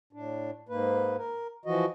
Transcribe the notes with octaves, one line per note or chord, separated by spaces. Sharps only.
A2 D4
G#2 A#3 B4
A#4
E3 F3 F#4 D#5